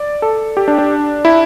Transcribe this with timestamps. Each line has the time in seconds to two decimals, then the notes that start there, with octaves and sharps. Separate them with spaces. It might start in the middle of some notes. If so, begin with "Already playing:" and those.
Already playing: D5
0.22 A4
0.57 G4
0.68 D4
0.78 D4
1.25 E4